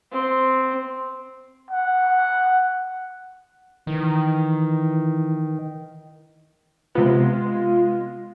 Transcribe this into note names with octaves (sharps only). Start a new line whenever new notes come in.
C4
F#5
D#3 E3
C3 G#3 B3 F4